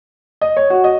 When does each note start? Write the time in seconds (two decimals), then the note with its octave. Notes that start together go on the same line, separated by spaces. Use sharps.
0.41 D#5
0.57 C#5
0.70 F#4
0.84 D#5